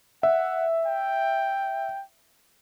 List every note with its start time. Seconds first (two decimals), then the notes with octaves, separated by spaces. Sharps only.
0.23 E5 F#5
0.87 G5